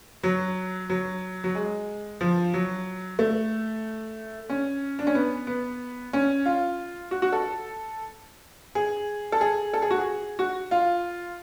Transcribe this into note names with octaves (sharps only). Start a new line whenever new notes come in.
F#3
F#3
F#3
G#3
F3
F#3
A3
C#4
D4
C#4
B3
B3
C#4
F4
F#4
F#4
A4
G#4
A4
G#4
A4
G#4
F#4
G#4
F#4
F4